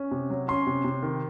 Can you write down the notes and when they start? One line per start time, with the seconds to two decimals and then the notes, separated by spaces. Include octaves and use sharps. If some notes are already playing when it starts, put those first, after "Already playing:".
Already playing: C#4
0.11 C3
0.30 F#3
0.48 C#4 C6
0.67 C3
0.84 C3
1.03 D#3